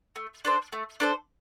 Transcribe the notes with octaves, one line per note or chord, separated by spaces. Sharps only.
A3
D4 A4 C5
A3
D4 A4 C5